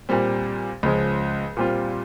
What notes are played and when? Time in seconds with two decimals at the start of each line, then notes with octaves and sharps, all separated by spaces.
0.09 A#2 G3 C4
0.83 C#2 C#3 F3 G#3
1.57 A#2 G3 C4 F4